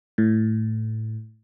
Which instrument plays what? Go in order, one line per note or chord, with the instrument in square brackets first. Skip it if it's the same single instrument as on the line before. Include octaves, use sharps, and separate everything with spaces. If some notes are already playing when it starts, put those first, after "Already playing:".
[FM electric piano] A2